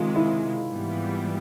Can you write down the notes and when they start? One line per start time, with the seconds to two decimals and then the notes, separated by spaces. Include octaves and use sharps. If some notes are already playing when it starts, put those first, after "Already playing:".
Already playing: C3 D#3 G#3 F4
0.16 E4
0.71 G#2 E3 G3 B3